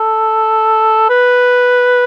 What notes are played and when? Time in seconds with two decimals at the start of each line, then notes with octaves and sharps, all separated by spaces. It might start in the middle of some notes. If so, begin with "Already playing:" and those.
Already playing: A4
1.09 B4